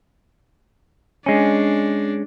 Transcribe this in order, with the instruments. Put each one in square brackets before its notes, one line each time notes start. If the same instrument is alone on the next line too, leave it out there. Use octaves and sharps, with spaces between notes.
[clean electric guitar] G#3 C#4 [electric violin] D4